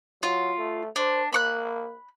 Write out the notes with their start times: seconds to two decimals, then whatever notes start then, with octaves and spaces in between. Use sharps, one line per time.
0.23 F#3 F4
0.58 A3
0.96 D4 C5
1.33 A#3 B5 C#6 F#6